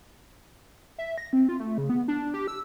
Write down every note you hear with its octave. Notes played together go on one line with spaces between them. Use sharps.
E5
A#6
C4
F4
A3
C#3
B3
D4
G4
E6